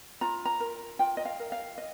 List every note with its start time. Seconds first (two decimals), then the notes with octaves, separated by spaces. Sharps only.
0.21 F4 A#5
0.45 A#5
0.60 A#4
0.99 F4 G5
1.17 D#5
1.25 F5
1.40 A#4
1.52 F5
1.78 D#5